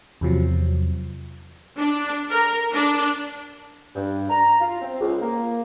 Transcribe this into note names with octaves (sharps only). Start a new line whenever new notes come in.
E2 C3 F3 F#3
D4
A#4
D4
G2
A#5
F4
C4
C#2
A#3